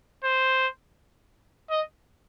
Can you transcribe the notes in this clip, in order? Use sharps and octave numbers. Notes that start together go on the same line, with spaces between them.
C5
D#5